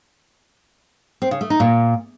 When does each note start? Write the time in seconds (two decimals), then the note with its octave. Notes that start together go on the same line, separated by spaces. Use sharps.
1.22 C4
1.31 C#3
1.41 A3
1.50 D#4
1.60 A#2